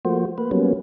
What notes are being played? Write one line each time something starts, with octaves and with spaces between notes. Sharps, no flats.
F3 A3 A#3 F#4 C5
A#3 B4
F#3 G3 A#3 B3 C#4